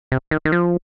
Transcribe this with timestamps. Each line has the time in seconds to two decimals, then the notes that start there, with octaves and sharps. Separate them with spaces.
0.12 C3
0.31 D#3
0.45 D#3
0.52 F3